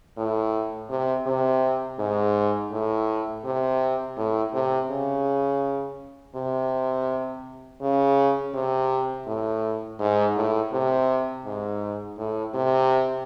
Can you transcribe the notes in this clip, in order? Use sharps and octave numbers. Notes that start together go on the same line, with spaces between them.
A2
C3
C3
G#2
A2
C3
A2
C3
C#3
C3
C#3
C3
A2
G#2
A2
C3
G#2
A2
C3